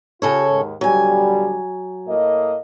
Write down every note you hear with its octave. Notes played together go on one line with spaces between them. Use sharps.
C#3 F4 G4 A4 C#5
D#2 G#2
B2 D3 F#3 G3 G#5
A2 A#3 D#5